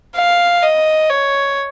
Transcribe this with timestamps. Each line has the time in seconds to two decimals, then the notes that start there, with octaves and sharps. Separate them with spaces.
0.16 F5
0.62 D#5
1.09 C#5